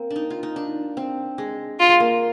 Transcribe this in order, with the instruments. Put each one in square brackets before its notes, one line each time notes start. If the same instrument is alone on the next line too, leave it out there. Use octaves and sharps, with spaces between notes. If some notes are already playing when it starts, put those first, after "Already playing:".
Already playing: [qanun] A#3 C4
D4
D#4
F4
D#4
D4
C4
G#3
[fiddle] F4
[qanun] G#3
A#3